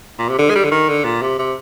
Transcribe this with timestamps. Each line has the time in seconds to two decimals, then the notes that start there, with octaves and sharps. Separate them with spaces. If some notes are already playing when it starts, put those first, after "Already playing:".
0.19 A#2
0.29 C3
0.39 D3
0.50 G#3
0.56 G3
0.64 D3
0.71 D#3
0.89 D3
1.05 A#2
1.22 C3
1.39 C3